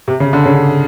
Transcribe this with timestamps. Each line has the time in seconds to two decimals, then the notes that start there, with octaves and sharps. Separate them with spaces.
0.08 C3
0.20 C#3
0.33 D3
0.45 C#3